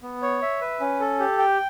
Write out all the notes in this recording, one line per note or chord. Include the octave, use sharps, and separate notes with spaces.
B3
C#5
E5
B4
C#4
A4
G4
G5